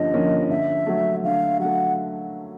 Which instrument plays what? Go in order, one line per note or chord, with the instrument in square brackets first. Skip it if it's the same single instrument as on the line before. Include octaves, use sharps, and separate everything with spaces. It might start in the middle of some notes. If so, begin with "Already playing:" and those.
Already playing: [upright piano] G2 D3 F3 A#3 C#4 [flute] D#5
[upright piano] D3 F3 A#3 C#4
[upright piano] D3 [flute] E5
[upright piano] F#3 A3
[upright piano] D3 [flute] F5
[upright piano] F#3 A3 [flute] F#5